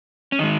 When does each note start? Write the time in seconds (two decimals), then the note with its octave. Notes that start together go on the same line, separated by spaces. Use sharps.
0.32 C#4
0.39 D#3 G#3 D#4